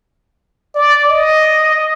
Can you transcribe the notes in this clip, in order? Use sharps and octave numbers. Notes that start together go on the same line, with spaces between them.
D5
D#5